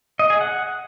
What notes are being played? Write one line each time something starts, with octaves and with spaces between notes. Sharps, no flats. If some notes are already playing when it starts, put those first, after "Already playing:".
D#5
G#4
F#5